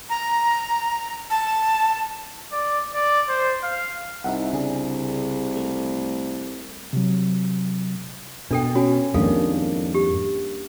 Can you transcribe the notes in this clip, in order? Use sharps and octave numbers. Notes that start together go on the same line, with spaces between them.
A#5
A5
D5
D5
C5
F5
C2 D#4 E5 F#5
C#3 D4 G#4
A3
C3 F#3
B2 D4 A4 G5
C#4 F#4 G#5
F2 G#2 D#3 G3 A#3 D4 A4 F5
G4